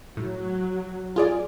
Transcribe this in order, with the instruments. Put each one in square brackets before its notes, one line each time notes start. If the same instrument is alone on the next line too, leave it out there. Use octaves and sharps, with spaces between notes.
[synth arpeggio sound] A2 [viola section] F#3
[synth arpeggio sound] F4 G#4 D5